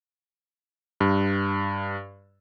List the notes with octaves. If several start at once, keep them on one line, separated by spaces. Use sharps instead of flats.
G2